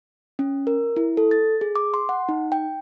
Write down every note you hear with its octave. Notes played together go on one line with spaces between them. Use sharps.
C#4
A#4
E4
A4
A6
G#4
D6
C6
F#5
D#4
G5